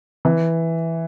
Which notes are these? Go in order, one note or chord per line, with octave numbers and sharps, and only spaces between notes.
E3